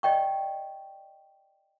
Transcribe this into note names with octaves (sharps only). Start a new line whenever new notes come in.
D5 D#5 G5 C#6